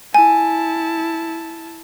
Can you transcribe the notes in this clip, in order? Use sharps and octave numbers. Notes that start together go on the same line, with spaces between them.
E4 G#5 A5